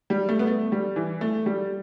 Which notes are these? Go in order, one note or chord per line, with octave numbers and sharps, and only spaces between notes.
G3
A3
B3
A3
G3
E3
A3
G3